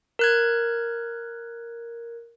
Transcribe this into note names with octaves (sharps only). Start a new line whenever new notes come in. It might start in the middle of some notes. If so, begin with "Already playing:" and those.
A#4 F#6 G#6